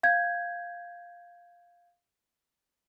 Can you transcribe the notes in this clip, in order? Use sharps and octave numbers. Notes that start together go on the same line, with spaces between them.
F5 G6 G#6